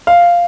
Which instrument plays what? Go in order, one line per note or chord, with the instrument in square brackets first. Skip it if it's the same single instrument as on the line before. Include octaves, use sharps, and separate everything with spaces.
[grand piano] F5